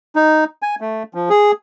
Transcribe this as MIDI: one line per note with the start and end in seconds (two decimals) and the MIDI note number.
0.16 0.44 63
0.62 0.75 80
0.81 1.03 57
1.14 1.29 53
1.30 1.51 68